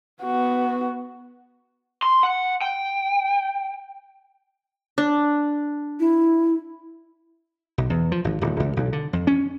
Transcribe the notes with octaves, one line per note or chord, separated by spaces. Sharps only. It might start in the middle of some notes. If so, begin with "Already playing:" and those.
B3 F#4
C6
F#5
G5
D4
E4
B1
E2
F3
G#1
D1
C#2
B1
D3
F2
C#4